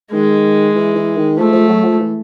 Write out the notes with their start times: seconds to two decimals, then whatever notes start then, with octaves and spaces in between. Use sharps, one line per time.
0.12 D#3 G#3
0.75 E3
0.95 E3
1.16 D#3
1.37 F3 A3
1.52 F3
1.68 F#3
1.84 F3
1.99 E3